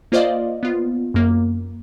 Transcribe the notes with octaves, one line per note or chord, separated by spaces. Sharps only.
A#3 F4 C5 D5 D#5 F5
B3 F4
F#2 A#3